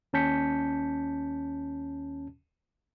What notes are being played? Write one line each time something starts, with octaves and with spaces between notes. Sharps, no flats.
D#2 C#4 A5 G6 B6 C#7